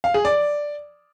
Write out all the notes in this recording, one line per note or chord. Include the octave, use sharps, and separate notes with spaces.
F5
G#4
D5